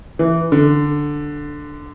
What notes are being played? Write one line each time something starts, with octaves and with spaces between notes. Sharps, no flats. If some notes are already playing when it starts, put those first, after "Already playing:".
E3
D3